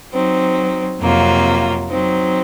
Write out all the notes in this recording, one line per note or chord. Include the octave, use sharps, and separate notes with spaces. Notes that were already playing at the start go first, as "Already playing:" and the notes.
F#3 C4 D#4
F2 C3 F#3 A#3 F4
F#3 C4 D#4